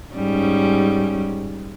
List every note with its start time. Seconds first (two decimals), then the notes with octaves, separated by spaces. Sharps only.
0.14 G#2 G3 C#4